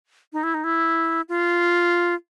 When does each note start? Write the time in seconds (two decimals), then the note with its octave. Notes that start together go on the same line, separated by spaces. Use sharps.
0.33 D#4
0.43 E4
0.54 D#4
0.64 E4
1.29 F4